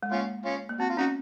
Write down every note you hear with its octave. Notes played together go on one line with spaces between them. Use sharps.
G#3
A#3 C#4 F4
C#4 F4
A#3
C4 F#4
F4
C#4 D#4 F#4